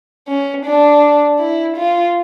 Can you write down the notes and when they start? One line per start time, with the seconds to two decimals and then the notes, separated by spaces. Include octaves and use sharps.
0.28 C#4
0.66 D4
1.40 E4
1.77 F4